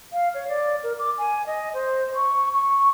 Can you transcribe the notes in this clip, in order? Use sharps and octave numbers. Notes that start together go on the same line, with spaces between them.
F5
C#5
D5
A#4
D6
G#5
D#5
C5
C#6
C#6